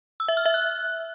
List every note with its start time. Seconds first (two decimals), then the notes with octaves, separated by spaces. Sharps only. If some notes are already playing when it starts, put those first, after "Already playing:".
0.20 E6
0.28 E5
0.37 F6
0.46 E5
0.54 F#6